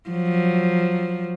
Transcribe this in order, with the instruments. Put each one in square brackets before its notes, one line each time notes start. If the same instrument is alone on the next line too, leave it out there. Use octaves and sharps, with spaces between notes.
[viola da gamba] F3 F#3